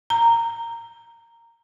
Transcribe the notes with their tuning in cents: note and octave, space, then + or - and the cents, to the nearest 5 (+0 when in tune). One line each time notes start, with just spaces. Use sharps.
A#5 -10